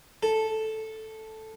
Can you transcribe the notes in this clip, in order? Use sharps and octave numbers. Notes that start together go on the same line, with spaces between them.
A4